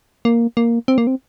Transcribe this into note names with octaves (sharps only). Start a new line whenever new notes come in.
A#3
A#3
C4
A#3
C4